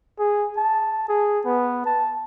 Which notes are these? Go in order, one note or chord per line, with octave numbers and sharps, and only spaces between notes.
G#4
A5
G#4
B3
A5